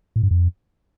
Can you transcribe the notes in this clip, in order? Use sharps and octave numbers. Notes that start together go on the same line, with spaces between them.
A2
G2
F2